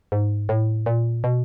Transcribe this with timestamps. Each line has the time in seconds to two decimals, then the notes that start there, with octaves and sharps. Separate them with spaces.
0.12 G#2
0.49 A2
0.86 A#2
1.24 B2